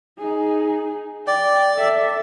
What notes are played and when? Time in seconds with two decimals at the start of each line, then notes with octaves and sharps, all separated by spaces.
0.19 D#4 G#4
1.27 D5 G5
1.75 A4 E5